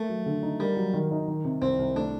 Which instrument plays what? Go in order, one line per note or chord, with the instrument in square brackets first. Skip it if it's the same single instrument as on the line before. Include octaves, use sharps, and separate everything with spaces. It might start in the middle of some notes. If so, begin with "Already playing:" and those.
Already playing: [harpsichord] A3 [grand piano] A#3
[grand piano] F#3
D3
D#4
[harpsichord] G3 [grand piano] A#3
[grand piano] F#3
D#3
D#4
D#3
C3
[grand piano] C2 [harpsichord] C4
[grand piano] C2
[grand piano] A3 [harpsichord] D4